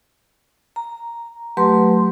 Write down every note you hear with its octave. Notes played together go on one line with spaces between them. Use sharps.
A#5
F#3 A3 G4 B4 C6